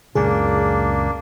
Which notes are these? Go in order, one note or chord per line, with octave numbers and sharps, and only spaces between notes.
C#2 F#2 A#2 A#3 D4 G#4